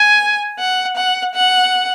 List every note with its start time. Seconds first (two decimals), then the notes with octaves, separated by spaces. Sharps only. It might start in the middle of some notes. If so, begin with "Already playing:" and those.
Already playing: G#5
0.59 F#5
0.97 F#5
1.35 F#5